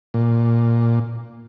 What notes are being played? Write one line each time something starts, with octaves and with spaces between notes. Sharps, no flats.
A#2